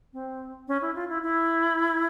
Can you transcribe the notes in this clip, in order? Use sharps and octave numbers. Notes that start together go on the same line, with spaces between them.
C4
C#4
E4
F4
E4
E4